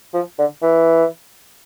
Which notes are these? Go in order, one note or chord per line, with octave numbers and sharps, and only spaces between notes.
F3
D3
E3